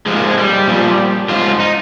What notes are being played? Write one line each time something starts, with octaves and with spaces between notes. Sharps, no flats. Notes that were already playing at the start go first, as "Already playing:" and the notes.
G#2 F3 G#3
A#3
G#3
G3
A#2 F3
G#2 F3 F4
D#4